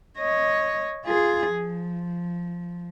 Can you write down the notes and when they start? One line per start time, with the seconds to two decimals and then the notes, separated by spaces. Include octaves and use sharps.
0.19 C#5 D#5
1.06 F4 G#4
1.50 F3